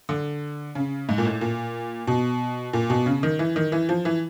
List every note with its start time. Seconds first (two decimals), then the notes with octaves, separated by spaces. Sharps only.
0.09 D3
0.75 C#3
1.09 G#2
1.18 A#2
1.25 A2
1.41 A#2
2.07 B2
2.73 A#2
2.90 B2
3.06 C#3
3.23 D#3
3.39 E3
3.56 D#3
3.72 E3
3.89 F3
4.05 E3